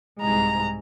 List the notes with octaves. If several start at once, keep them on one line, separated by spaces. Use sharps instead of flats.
C2 G#2 G#3 A#5